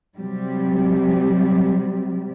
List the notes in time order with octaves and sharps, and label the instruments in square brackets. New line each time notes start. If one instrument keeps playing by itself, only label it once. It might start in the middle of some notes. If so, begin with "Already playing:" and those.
[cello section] C3 F#3 G3